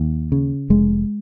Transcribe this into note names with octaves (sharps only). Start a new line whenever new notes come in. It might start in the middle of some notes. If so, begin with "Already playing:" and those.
Already playing: D#2
C#3
F1 G#3